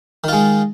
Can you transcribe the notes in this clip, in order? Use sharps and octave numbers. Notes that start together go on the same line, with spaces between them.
D#3 G#3 F4